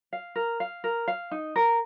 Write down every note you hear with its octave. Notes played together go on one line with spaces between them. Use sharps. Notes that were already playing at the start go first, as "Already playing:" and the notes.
F5
A#4
F5
A#4
F5
D#4
A#4